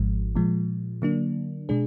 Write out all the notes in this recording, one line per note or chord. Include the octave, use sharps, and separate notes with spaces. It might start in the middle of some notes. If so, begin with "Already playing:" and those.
Already playing: G#1 G#2 F3 G#3
A#2 F3 G#3
D3 F#3 A#3 D4
B2 G#3 D4 G#4